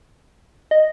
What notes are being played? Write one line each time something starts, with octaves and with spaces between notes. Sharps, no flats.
D#5